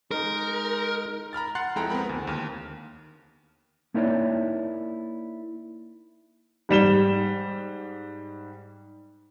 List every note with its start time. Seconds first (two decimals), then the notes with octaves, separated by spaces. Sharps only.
0.11 G#3 D#4 A#4 F6
1.33 A#5 B5 F6 A6
1.55 F#5 C6 F#6 A6 C7
1.76 F2 G#3 E4 A4 G5 A#5
1.90 B3 C4 A#4 B5
2.09 D2
2.27 D#2 F6
3.94 A#3 D#4 E4 A#4 C#5 D5
6.69 G#2 G3 E7 G7